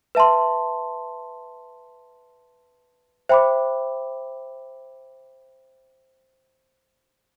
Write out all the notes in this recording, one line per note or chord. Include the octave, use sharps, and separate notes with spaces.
B4 E5 A5 C6
C5 E5 G5 B5 D6